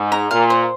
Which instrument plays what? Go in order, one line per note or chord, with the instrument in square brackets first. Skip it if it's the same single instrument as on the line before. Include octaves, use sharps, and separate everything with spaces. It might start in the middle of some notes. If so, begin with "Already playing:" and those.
Already playing: [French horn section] G#2
[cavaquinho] A#5
[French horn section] A#2 [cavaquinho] F5
[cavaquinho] C5